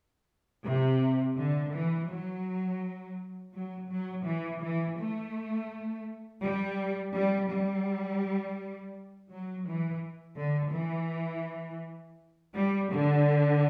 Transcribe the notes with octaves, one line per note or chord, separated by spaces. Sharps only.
C3
D3
E3
F#3
F#3
F#3
E3
E3
A3
G3
G3
G3
F#3
E3
D3
E3
G3
D3